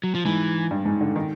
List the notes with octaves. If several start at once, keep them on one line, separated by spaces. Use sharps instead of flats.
F#3
F3
G#2 E3
G2
G#2
D3
D#3